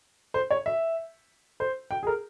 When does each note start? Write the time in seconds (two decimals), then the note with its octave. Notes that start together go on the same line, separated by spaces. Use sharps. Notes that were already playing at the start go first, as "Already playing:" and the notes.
0.34 C5
0.51 C#5
0.66 E5
1.60 C5
1.91 G5
2.03 G#4
2.07 A#4